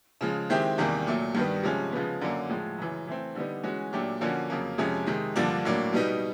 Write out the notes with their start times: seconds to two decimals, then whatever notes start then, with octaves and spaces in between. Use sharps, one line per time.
0.21 C#3 F3 G#3
0.50 D#3 G#3 C4 E4 G4
0.78 E2 C3 D#3 G3 A#3
1.07 A#2 F#3 A3
1.35 G2 D#3 G3 B3
1.63 C3 F3 G#3 C#4
1.92 C#3 F3 G#3 B3
2.21 F#2 D3 F#3 A#3
2.49 A2 F3 G#3
2.78 F#2 C#3 E3
3.07 E3 A3 C4
3.35 D3 G3 B3 D#4
3.63 E3 G#3 C#4 F#4
3.93 A#2 F#3 A3 D4 G4
4.21 D3 F3 A#3 C#4 F#4
4.50 F2 C#3 F#3 A#3
4.78 F2 C3 F3 G#3 C#4
5.07 C3 D#3 G#3
5.35 G2 D3 F3 A#3 D4
5.65 A2 F#3 A#3 D4
5.93 B2 G3 B3 D#4